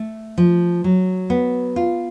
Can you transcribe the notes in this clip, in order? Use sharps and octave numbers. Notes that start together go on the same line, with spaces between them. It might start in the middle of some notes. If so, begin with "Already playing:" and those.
Already playing: A3
F3
F#3
B3
F4